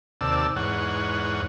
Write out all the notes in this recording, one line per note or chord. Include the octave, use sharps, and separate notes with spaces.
D#2 C3 D5 A5 E6
E2 G#2 C#5 F#5